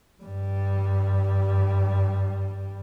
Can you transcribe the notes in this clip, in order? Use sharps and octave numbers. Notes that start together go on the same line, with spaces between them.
G2 G3